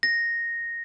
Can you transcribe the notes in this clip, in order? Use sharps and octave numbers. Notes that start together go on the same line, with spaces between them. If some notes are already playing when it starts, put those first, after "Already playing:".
A#6